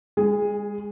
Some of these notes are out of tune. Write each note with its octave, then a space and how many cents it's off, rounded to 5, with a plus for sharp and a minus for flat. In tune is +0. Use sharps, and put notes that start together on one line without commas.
G#3 -35 G#4 +0